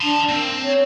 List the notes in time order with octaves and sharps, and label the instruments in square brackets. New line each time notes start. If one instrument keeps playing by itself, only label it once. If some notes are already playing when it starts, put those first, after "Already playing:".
[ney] D4 [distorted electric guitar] A5 C6
[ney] A#3 [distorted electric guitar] C4
[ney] C#5